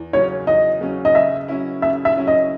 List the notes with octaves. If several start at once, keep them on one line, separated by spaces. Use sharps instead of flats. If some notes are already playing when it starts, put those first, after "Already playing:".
Already playing: E2
C#3 F#3 C#4 C#5
E2 D#5
C#3 F#3 C#4
D#5
C#3 E5
F#3 C#4 E4
C#3 E5
E5
F#3 C#4 E4
D#5